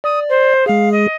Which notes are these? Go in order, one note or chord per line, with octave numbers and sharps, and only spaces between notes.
D5 D#6
C5
G#3 G#4 F5
D#5